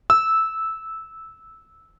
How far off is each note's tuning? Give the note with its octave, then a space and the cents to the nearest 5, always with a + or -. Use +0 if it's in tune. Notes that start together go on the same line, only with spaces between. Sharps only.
E6 -10